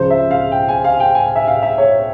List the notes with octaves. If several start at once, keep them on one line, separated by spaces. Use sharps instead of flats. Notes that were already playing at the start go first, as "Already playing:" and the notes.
Already playing: C#2 C#3 F3 C5
E5
F5
G5
G#5
F5
G5
G#5
E5
F5
E5
C#5